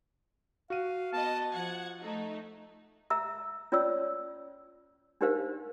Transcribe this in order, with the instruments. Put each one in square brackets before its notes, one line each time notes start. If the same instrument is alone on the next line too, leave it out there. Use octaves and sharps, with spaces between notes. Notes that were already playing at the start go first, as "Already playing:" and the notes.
[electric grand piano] F#4 D#7 [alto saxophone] F5
[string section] B3 D#5 [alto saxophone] A5
[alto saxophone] F3 [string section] F#5 G#6
[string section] A3 D#4
[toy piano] E5 A#5 E6
C#4 F4 C#5 D5 E6
D4 D#4 G4 A#4 C5 F5